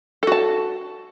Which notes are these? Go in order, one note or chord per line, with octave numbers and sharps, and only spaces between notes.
F#4 A4 A5